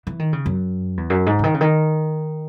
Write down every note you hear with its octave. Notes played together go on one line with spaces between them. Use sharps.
E3
D#3
C#3
F#2
E2
F#2
G#2
C#3
D#3
C#3
D#3